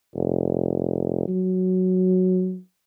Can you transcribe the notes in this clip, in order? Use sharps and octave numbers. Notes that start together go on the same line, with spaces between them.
F1
F#3